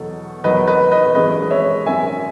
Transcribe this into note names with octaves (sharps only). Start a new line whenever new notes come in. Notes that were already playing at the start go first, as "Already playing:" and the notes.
Already playing: E2 B2 F#3 A4
E2 D#3 F#3 B4 D#5
B4 D#5
B4 D#5
G#1 F#2 E3 G#3 B4 D#5
C#5 E5
G#1 F#2 D#3 E5 G#5